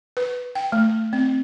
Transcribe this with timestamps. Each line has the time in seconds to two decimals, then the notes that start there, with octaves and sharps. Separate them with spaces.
0.17 B4
0.55 G5
0.72 A3
1.13 C4